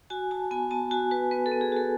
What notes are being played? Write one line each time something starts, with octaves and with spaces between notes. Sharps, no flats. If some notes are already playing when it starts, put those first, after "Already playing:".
F#4 G#5
F#4 A5
B3 G#5
B3 A5
F#4 G#5
F#4 B4
B3 B4
A4
B3
G#4
F#4 A4